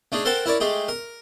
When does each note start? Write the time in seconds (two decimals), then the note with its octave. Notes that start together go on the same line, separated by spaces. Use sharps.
0.12 A3 D4 D#4 G#4
0.25 A4 A#4 C5 F#5 G5 A5
0.46 E4 A#4 C#5 D5
0.60 G#3 A3 G4 G#4
0.88 A#4